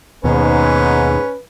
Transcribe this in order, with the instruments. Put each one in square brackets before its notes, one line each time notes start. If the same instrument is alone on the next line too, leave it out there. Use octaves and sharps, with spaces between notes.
[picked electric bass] D#2 B2 [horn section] G#2 [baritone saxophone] C#4 [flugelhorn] B4